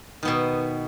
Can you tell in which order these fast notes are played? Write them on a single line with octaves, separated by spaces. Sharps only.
D#3 B3 B2